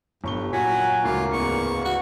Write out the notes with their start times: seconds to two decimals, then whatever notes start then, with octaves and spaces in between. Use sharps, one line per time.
0.24 G1 G2 C#6 G7
0.53 A#2 F#3 F#4 G#5 C#6 B6
1.04 D2 G#2 C#3 A#3 F4
1.32 E2 C#6
1.85 F#4